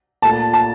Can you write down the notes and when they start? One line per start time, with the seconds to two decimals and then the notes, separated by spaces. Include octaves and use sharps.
0.22 A#2 A3 A5
0.53 A5